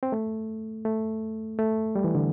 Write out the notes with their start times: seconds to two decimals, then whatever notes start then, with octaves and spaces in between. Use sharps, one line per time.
0.03 C4
0.12 A3
0.85 A3
1.59 A3
1.96 G3
2.04 E3
2.15 D3